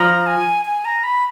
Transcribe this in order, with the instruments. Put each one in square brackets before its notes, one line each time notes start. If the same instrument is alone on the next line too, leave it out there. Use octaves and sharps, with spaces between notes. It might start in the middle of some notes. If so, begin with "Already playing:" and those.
Already playing: [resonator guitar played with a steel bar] F3 [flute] A#5
[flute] G#5
G#5
A#5
B5